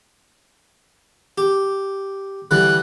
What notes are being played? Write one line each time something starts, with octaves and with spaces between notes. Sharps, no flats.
G4
D3 E3 G3 F#6